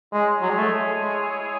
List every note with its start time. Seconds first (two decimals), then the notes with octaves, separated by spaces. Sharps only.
0.13 G#3 E4 G#4 C#5
0.41 F#3
0.50 G#3
0.58 A3
1.01 G#3